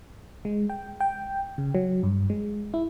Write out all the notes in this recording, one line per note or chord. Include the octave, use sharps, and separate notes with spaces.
G#3
G5
G5
C#3
F#3
G2
G#3
E4